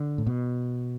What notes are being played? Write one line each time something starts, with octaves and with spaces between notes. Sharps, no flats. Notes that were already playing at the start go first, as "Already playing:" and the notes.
Already playing: D3
A2
B2